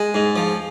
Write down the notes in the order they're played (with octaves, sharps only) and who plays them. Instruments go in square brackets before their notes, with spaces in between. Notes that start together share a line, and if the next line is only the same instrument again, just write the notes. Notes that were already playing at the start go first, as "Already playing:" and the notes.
Already playing: [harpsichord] G#3
G#2
F3